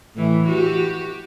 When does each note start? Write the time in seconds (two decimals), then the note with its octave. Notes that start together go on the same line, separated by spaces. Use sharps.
0.15 A2 E3
0.49 F#4 G4